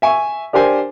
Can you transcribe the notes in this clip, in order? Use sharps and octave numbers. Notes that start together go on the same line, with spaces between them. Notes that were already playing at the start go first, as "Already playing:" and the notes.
E5 G#5 C#6
D4 G4 A#4 C5 G#5